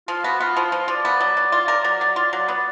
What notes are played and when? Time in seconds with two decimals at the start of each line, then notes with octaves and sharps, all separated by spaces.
0.08 F3 F4
0.24 B3 F#4
0.40 B3 F4
0.57 F3 F4
0.72 F3
0.88 F3 D5
1.05 B3
1.20 F#3
1.37 F#3
1.52 F4
1.68 A#4
1.84 F#3
2.01 F#3
2.16 F4
2.33 F#3
2.48 B3 D5